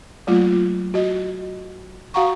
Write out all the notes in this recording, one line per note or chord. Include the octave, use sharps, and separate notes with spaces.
F#3 A3 A#3 F4
F#4 D#5
F#4 F5 F#5 A#5 C#6